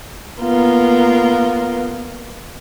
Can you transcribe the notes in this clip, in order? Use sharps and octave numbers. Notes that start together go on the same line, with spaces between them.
A#3 B3 F4 A#4